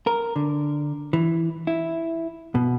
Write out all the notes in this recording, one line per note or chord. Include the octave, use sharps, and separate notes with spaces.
A#4
D3
E3
E4
B2